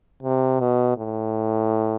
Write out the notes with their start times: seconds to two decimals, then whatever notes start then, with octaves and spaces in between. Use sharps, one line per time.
0.23 C3
0.60 B2
0.97 A2